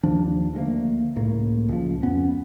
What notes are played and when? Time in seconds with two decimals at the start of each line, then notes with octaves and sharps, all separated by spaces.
0.03 D#2 F3 D4
0.54 D2 G#3 A#3
1.16 C#2 A2 A#3
1.68 C#2 F3
2.03 F2 B3 C#4